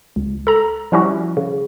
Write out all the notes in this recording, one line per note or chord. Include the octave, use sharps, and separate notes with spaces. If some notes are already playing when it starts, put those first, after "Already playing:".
C#2
A4 A#5
F3 G3 C#4 E4 F#4
C#3